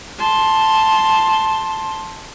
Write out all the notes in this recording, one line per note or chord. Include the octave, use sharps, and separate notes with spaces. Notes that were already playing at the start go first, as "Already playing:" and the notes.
A5 C6